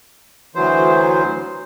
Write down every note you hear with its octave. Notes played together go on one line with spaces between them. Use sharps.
D2 E3 F#3 C5